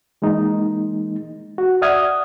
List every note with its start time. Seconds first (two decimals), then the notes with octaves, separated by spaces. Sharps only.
0.22 E3 G#3 A#3 D#4
1.58 F#4
1.82 D5 E5 F#5 D#6 F6 G#6